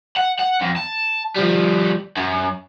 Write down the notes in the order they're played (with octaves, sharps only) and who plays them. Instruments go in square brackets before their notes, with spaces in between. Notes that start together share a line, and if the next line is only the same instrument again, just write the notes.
[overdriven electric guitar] F#5
F#5
F2
A5
F3 G3
F#2